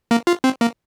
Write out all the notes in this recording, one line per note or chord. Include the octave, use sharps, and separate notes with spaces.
A#3
F4
C4
A#3